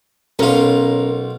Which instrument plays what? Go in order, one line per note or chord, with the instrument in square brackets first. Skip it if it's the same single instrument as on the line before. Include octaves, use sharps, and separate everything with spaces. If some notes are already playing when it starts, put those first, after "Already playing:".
[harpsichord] B1 F4 [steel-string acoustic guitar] C#4 A#4 B4